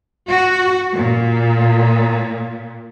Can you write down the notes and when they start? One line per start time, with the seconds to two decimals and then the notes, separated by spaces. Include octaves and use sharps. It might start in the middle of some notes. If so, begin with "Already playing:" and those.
0.29 F#4
0.95 A#2